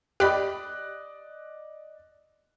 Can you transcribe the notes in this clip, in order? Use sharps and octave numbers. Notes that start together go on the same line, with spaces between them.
G4 D5 D#5 B5 F#6